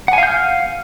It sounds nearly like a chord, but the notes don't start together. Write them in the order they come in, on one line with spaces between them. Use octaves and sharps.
F#5 G#5 F5 G6 F6